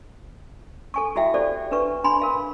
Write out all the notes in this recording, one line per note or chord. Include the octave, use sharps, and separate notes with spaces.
A4 G#5 C#6
E4 F#4 E5 F5 G5
G4 A4 C5 D5
D4 B4 C#6
D4 G#5 B5 C6
A#4 F5